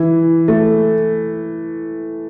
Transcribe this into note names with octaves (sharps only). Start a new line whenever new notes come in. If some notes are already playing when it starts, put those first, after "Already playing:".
Already playing: E3
A3